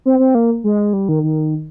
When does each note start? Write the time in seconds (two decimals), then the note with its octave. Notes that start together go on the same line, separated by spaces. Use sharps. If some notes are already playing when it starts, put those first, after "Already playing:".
0.06 C4
0.19 C4
0.35 A#3
0.64 G#3
0.93 G3
1.09 D#3
1.23 D#3